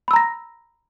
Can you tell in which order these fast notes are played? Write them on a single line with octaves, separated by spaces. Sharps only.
B5 E6 A#5 A#6